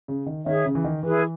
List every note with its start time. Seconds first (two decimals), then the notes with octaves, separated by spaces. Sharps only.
0.08 C#3
0.26 D#3
0.46 D#3 G#4 C#5 E5
0.65 C#3
0.75 E3
0.84 D#3
1.03 E3 E4 G#4 B4